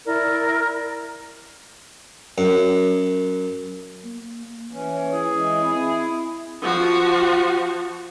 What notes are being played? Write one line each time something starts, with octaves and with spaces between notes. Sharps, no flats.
E4 A#4 D5
F#2
A#3
E3 C#4
C#5
E4 G#4
E3 G#3
C4 E4
F3 F#4